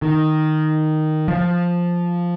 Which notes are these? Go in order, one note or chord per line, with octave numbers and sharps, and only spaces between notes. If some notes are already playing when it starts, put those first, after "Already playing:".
D#3
F3